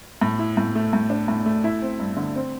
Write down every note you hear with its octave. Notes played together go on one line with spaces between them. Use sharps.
A2
E4
A2
A3
A2
D4
A2
A3
E4
C4
G2
D3
C4